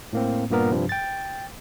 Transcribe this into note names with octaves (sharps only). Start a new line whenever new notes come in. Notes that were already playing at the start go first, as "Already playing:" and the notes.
A2 A#3 C4
G2 A#2 A#3 B3 A#4
G2 C3 F3 G3
G5 A6